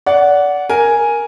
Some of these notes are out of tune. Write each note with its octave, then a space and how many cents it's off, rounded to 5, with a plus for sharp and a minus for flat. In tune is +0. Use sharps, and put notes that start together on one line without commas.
D5 -25 F#5 +0
A#4 +0 G#5 +0